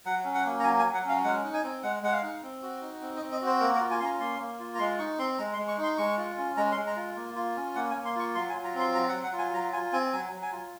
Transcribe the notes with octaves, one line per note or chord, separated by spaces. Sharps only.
F#3 F#5
C#4
F#5
A#3
A#5
F#3 G#5
G#5
F#3
F#5
C#4 F5
G#3 F#5
D#4
G#5
C4
G#3 F#5
G#3 F#5
F5
D#4
C4
F#4
D#4
C4
D#5
C4
D#5
F#4 C5
A#3 A#4
A#4
F4
G#5
C#4 C6
A#5
A#3 C6
A#3
F4
A#5
G#3 C6
D#4 C#6
C4 C6
G#3 A#5
C6
G#3
C#6
D#4
C6
G#3 C#6
F4
C#4
G#3 A#5
C6
G#3
A#5
F4
A#3
F4
C#4
A#3 F#5
G#5
A#3
C6
F4 C#6
F#3 C6
G#5
F4
A#5
C4 C6
F#3 A#5
F#5
F#3
F#5
F4
G#5
F#3 A#5
F4 G#5
C4 G#5
F#3 G#5
F#3
G#5
F4